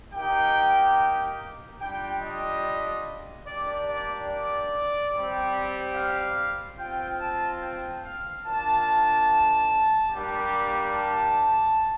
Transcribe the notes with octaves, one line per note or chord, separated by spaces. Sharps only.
A#3 D#4 G4 G5
G3 D4 F4 G5
D#5
A#3 D4 G4 D5
D5
D5
G3 C4 G4
F5
C4 F4 G5
A5
G5
F5
A#3 D4 F4 A5
G3 A#3 D4 G4
A5